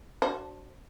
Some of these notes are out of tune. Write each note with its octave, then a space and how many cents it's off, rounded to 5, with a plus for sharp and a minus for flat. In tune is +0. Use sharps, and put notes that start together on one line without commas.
D4 +0 F#4 +20 C5 +30